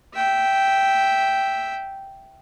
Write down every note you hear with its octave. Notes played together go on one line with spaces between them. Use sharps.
E5 G5